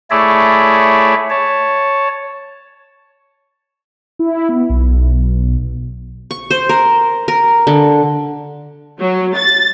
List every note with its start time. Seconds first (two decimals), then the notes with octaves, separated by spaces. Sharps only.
0.11 A3 E4 G#4 C#5 D5 E5
1.30 C#5 A5
4.19 E4
4.49 B3
4.69 B1
6.31 C#6
6.51 C5
6.69 A#4
7.28 A#4
7.67 D3
8.98 F#3
9.34 A6